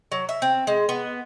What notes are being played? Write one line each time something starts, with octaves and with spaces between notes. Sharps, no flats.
F#3
E5
C4
G#3
B3